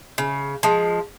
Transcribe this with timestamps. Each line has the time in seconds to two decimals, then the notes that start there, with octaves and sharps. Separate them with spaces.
0.18 C#3
0.63 F3 G#3